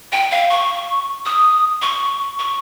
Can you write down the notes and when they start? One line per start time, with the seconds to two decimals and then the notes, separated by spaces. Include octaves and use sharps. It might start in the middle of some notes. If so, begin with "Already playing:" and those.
0.12 G5
0.31 F5
0.50 C#6
1.25 D#6
1.82 C#6
2.39 C#6